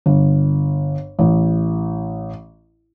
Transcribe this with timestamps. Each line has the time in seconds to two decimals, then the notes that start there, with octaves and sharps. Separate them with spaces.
0.06 G1
1.19 A1